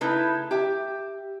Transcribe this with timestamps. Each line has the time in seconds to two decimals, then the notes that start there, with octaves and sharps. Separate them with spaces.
0.01 C#3 A3 D#4 E4 B4
0.51 G4 E5